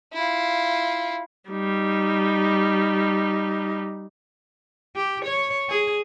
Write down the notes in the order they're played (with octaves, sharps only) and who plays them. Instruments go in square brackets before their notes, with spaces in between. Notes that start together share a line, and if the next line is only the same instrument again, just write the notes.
[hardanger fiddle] E4 F4
[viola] G3 D#4
[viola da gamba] G4
C#5
G#4